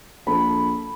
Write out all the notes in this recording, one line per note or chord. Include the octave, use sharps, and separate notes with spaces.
A#1 A4 B5